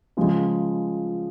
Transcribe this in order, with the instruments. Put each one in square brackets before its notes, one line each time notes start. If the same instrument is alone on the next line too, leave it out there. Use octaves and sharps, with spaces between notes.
[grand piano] C#3 F3 G#3